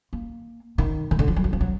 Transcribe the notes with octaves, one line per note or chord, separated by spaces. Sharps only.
A#3
D#3
D#3
D3
F3
F#3
D#3
F3
F#3